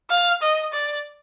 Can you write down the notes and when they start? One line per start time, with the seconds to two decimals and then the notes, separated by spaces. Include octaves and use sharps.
0.10 F5
0.42 D#5
0.73 D5